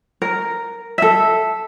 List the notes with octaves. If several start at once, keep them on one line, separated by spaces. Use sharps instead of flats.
A#4
A4 E5